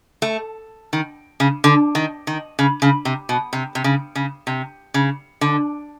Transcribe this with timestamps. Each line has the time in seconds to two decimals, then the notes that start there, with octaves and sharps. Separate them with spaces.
0.22 A3
0.93 D#3
1.40 C#3
1.64 D3
1.95 D#3
2.27 D#3
2.59 C#3
2.82 C#3
3.05 C3
3.29 B2
3.53 C3
3.75 C3
3.84 C#3
4.15 C#3
4.47 C3
4.94 C#3
5.41 D3